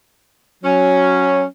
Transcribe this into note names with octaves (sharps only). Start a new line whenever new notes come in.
F#3 C#4